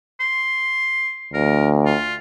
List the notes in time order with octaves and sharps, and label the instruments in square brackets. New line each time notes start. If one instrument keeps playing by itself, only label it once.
[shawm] C6
[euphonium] D2 [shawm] A#4
[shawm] F4